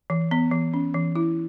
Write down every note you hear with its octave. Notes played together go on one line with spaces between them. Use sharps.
E3
B3
E3
C#4
E3
E4